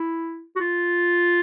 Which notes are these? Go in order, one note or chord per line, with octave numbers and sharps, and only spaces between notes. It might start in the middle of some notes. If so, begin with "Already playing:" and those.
Already playing: E4
F#4
F4